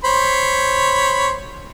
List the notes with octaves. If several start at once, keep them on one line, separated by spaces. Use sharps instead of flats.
C5 C#5 B5